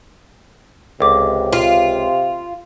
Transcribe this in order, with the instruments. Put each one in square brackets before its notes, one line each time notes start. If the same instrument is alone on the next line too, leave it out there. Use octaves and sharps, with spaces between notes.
[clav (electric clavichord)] C#2 [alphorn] C3 [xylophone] A4 D6
[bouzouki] F4